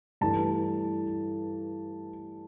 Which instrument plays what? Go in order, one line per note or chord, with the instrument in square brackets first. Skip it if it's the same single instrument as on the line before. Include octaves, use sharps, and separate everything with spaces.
[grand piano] G2 E3 A3 A5